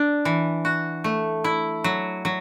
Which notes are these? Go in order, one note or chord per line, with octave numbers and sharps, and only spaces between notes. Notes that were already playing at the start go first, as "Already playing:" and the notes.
Already playing: D4
E3
F#4
A3
E4
F#3
F#3